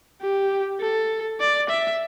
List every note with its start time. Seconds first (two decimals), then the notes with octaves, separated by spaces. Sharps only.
0.21 G4
0.80 A4
1.40 D5
1.70 E5